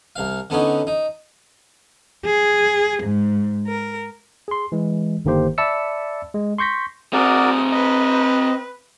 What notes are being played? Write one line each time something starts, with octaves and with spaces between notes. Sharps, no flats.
C2 F5
D3 B3 C#4 D#4
D#4
G#4
G#2
A#4
G#4 C6
E3 G#3
G1 D3 D#3 A#3 G4 C5
D5 E5 A5 B5 E6 C#7
G#3
C6 C#6 G6 A#6 B6
C4 F#4 G#4 A#4 D5 D#6
B4 D#5